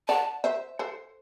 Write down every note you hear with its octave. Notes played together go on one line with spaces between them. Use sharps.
D5 F#5 A5
C5 E5
A4 C5